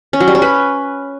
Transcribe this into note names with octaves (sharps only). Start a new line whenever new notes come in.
C#4
F#3
G3
C#4
B4